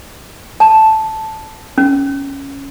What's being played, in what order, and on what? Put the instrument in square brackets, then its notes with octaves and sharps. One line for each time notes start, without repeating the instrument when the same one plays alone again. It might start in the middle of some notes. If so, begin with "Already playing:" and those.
[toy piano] A5
C#4